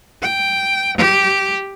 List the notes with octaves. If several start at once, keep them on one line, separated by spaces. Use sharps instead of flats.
G5
G4